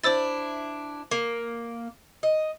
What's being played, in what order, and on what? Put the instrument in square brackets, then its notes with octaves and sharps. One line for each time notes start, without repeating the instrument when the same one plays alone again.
[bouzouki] D4 E4 [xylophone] C5 E6 A6
[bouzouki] A#3
D#5